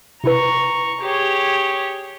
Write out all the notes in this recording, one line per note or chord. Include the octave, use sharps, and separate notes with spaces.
C3 E4 B4 A#5 C#6
G4 G#4 C#5